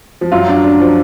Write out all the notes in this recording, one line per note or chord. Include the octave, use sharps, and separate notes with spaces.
F3
F#2 F#3 F4
D4
D4
F3